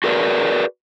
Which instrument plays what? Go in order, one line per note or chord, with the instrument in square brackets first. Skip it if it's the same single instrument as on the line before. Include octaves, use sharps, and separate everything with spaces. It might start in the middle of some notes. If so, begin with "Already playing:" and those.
[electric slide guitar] F#4 G#4 A#4 B4 D5